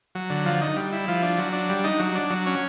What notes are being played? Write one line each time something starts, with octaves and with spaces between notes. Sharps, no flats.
F#3
D3
F3
D#4
G3
E4
F3
D4
F#3
D4
G3
D#4
F#3
D4
F#3
C#4